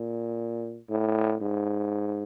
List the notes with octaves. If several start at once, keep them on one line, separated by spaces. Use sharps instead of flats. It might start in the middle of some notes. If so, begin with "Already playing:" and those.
Already playing: A#2
A2
G#2